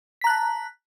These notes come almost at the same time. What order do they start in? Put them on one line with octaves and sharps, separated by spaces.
B6 A#5 F#6 A5